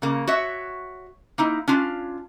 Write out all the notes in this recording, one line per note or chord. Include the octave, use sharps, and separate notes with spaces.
C#3 A#3
F#4 C#5 E5
A#3 D#4 E4
C#4 D4 F4